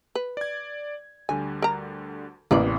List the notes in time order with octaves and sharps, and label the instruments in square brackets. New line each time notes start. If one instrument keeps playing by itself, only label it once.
[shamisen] B4
[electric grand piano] D5 G#6
[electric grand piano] D2 D3 G3 [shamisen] G#5
[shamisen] A#4 A#5
[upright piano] A1 [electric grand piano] E2 C3 [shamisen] A#3 B4 D5